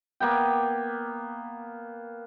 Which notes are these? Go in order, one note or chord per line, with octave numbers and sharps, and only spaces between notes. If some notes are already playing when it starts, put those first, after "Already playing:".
A#3 B3 G5